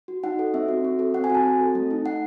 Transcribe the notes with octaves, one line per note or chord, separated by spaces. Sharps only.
F#4
D#4 F#5
A4
C4 E5
F#4
C4
A4
C4 F#5
G#5
F#4
A5
C4
A4
A3
D#4
A3 F#5